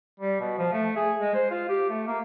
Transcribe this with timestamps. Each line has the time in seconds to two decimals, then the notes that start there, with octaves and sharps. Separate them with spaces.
0.20 G3
0.40 B2
0.58 F3
0.73 A3
0.96 G#4
1.20 G#3
1.35 C5
1.51 F4
1.69 G4
1.89 A3
2.07 A#3